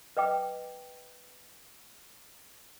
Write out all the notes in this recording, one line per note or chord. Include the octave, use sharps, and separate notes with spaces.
B4 D#5 G5 D6